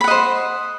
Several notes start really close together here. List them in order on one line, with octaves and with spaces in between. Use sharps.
B5 F#5 D#5 C5